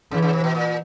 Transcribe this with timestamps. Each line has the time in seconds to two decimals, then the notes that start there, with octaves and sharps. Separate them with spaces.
0.11 C#3 E3
0.22 C#3
0.33 C3
0.44 B2
0.55 A#2